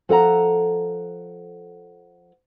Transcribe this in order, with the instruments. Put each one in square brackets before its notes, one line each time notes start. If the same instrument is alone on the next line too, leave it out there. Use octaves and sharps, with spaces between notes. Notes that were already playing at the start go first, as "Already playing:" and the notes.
[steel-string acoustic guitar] F3 A4 F#5 A#5